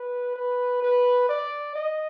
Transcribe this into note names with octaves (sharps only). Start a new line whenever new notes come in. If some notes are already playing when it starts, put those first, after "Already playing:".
Already playing: B4
B4
B4
D5
D#5